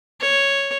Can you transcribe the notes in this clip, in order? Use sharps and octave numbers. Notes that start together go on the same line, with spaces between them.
C#5